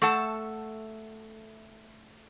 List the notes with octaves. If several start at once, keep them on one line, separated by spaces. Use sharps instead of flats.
A3 A4 F#5 A5